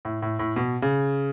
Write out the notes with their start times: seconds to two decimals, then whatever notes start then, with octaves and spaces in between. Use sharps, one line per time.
0.05 A2
0.22 A2
0.39 A2
0.56 B2
0.82 C#3